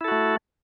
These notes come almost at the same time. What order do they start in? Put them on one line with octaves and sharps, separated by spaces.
E4 A4 F#4 A3